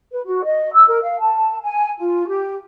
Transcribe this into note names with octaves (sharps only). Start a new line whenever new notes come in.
B4
F#4
D#5
E6
A#4
F5
A5
G#5
F4
G4